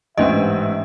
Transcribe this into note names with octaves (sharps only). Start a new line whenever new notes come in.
A1 G#2 C#4 D4 D#5 E5